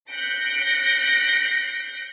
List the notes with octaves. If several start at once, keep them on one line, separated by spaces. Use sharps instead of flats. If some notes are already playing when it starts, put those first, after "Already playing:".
F#6 G6 A#6 B6 C#7 D7